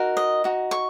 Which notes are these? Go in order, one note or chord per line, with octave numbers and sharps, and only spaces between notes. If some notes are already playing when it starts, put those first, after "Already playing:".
Already playing: D#4 F#4 A#4
D#5
D#4 F#4
C#6